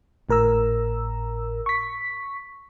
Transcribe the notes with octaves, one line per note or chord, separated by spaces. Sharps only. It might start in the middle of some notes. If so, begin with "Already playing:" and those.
G#1 A2 A#4 A#5 E6
C#6 B6